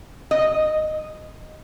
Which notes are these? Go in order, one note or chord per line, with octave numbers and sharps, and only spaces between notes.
D#5